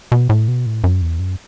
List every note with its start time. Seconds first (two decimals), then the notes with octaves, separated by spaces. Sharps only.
0.12 B2
0.29 A2
0.48 B2
0.66 A2
0.84 F#2
1.02 E2
1.20 F#2